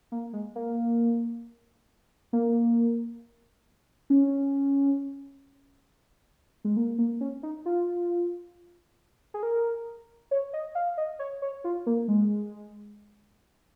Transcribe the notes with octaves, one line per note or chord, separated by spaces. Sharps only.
A#3
G#3
A#3
A#3
C#4
G#3
A#3
A#3
C#4
D#4
F4
G#4
A#4
C#5
D#5
F5
D#5
C#5
C#5
F4
A#3
G#3